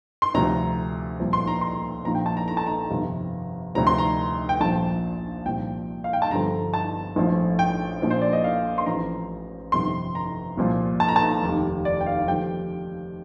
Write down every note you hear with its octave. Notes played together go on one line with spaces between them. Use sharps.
C6
D2 C3 F3 A#5
C2 A#2 F3
C6
A#5
C6
A#1 A#2 F3 A#5
G5
A5
A#5
A#5
A5
A#5
G1 F2 C3 D#3
D2 C3 F3 A#5
C6
A#5
G5
A#1 A#2 F3 A5
C2 A#2 F3 G5
F5
G5
A5
G1 G2 D3 F3 A#5
A5
A#1 A2 F3
G5
A#1 A#2 F3
C5
D5
D#5
F5
C6
A1 A2 F3 A#5
G1 F2 C3 D#3 C6
A#5
C2 A#2 F3
A5
A#5
A5
F1 D#2 D#3
D5
G5
F5
D#2 D3 F3 G5